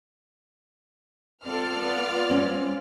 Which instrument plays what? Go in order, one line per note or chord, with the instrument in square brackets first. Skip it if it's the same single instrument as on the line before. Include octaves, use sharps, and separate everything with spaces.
[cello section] C4 A4 [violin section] F4 D5 F6
[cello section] B3
[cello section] G3 [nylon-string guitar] C4 C#4